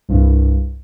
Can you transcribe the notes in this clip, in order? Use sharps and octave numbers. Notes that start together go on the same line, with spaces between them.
C2 G2